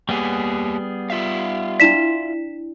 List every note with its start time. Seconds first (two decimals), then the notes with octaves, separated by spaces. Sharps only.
0.09 G3 A#3 B3 G4 G#4
1.10 F4 E5 F5
1.80 D4 E4 D5 B6 E7